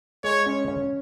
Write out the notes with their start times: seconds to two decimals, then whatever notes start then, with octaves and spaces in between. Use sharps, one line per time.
0.24 G#3 C#5
0.46 C#4
0.68 C#4